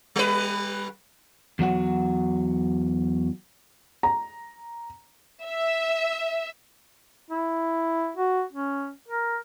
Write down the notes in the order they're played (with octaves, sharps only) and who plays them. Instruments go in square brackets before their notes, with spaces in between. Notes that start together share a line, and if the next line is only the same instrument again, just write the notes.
[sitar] G3 B4
[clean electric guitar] E2 F#3 F#4 F#5
[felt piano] A#5
[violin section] E5
[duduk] E4
F#4
C#4
A#4